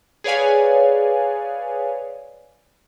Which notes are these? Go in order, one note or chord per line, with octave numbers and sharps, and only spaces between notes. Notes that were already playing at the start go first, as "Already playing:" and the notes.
G#4 B4 C#5 D5 F5 G#5